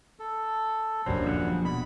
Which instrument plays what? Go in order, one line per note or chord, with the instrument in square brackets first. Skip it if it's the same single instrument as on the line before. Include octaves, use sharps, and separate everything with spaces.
[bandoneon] A4
[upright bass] D#1 D3 [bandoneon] F#2 G3 [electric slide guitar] F#3 C5
[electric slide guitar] F3 E5 F#5
[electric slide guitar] B2 [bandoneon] B5